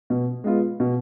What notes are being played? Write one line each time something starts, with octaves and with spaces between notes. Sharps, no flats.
B2
G#3 B3 F4
B2